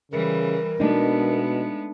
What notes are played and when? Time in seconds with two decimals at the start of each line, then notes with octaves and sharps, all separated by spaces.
0.12 C#3 E3 G3 A#4
0.80 B2 G#3 A3 B3 D4 D#4